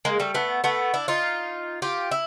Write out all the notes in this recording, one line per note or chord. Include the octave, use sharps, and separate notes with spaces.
G#3 A#3
G3 A3
A3 B3
A3 B3
D4 E4
D#4 F4
F4 G4
E4